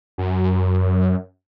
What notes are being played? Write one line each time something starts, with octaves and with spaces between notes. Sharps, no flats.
F#2